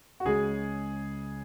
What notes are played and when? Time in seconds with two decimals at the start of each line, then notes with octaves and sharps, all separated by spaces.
0.20 F#4
0.25 C#2 C#3 G#3 G#4